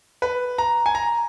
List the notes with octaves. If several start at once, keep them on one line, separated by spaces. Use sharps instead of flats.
B4
A#5
G#5
A#5